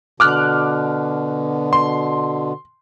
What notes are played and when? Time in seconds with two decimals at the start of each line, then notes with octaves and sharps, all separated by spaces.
0.20 B2 D3 D6 F6 F#6
1.73 C6